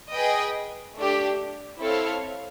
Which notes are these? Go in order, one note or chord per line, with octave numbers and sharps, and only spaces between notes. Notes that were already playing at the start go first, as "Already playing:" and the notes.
G#4 B4 D#5 G5
A3 D4 G4
C4 E4 A4 C#5 F5